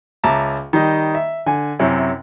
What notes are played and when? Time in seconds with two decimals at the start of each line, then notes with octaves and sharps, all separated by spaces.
0.24 C#2 E5 A5 A#5 D6
0.73 D#3 G3 D#5
1.15 E5
1.46 D3 G#5
1.79 F#2 C3 C#4 E4